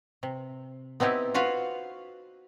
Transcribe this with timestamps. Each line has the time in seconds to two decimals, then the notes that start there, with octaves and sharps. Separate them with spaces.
0.23 C3
1.00 B3 C4 D#4 E4 G4
1.34 F4 F#4 B4 C5 F5